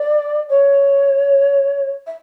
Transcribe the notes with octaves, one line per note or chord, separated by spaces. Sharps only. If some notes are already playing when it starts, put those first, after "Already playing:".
Already playing: D5
C#5
E5